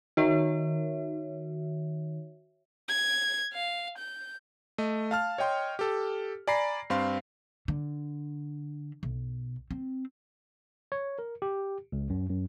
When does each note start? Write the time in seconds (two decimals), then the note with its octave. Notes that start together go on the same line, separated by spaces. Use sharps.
0.17 D#3 F#4 C#5 E5
2.88 G#6
3.53 F5
3.98 G6
4.78 A3 D#5
5.11 F5 A5 F6
5.38 C#5 D#5 G5 C6
5.79 G4 A4
6.47 D5 G#5 A#5 B5 A#6 C7
6.90 G2 C4 F5 C6
7.68 D3
9.03 B1
9.71 C4
10.92 C#5
11.19 A#4
11.42 G4
11.92 C#2
12.10 F#2
12.29 F#2